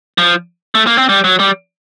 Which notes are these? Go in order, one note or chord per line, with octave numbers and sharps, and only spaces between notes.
F3
A3
A#3
C4
G3
F#3
G3